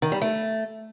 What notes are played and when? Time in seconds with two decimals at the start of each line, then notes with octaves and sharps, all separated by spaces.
0.02 D#3
0.12 G3
0.21 A3